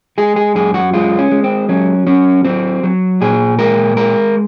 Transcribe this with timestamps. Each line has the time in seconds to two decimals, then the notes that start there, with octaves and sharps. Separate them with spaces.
0.18 G#3 G#4
0.36 G#4
0.55 F#2 G#4
0.74 F#4
0.93 G#3 F4
1.19 C#4
1.32 G#3
1.44 C4
1.69 F#3 C#4
2.07 F#3 C#4
2.45 F#3 C4
2.83 F#3
3.21 A#2 G#4
3.59 G#3 A#4
3.96 G#3 A#4